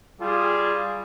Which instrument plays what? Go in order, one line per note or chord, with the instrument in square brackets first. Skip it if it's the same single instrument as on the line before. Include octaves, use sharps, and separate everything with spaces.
[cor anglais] G3 [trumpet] F4 [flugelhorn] G#4